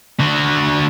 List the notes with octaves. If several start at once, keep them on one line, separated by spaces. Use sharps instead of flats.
D3 F#4